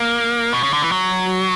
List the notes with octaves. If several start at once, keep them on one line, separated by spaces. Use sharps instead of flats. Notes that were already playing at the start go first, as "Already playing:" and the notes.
Already playing: A#3
B2
C#3
D3
E3
F#3